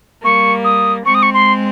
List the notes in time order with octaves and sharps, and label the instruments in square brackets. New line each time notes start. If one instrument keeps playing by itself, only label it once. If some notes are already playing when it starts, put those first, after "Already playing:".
[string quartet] G3 A#3 [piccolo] C#6
[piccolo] D#6
[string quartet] G#3 C4 [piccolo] C#6
[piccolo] D#6
C#6
C6